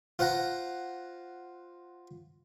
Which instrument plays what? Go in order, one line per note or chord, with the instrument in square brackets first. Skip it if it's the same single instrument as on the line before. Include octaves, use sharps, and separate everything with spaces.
[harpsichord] F4 C5 F#5 A#5